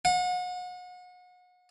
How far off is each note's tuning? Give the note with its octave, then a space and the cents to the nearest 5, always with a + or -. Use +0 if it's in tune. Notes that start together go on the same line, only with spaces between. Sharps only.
F#5 -35